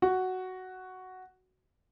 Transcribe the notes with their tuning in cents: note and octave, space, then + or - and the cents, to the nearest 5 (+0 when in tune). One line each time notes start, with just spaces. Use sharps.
F#4 +5